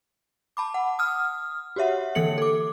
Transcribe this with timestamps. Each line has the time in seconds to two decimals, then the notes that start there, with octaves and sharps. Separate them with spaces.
0.57 A5 B5 D6
0.74 F#5
0.99 D#6 F6
1.76 F#4 G4 C#5 E5 F#5
2.15 D3 E3 A#3 A4 C#7 F#7
2.38 A4 D6